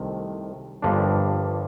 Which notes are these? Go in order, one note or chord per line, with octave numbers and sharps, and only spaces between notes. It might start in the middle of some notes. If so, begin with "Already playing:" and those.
Already playing: C2 C3 D#3 A3
G1 G2 F3 A#3 D4